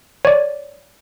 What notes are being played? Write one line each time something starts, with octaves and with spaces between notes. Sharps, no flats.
C#5 D5